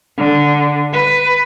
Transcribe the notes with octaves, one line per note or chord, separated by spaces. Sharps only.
D3
B4